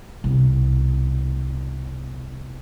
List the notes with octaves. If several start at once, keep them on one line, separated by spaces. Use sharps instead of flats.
C2 B2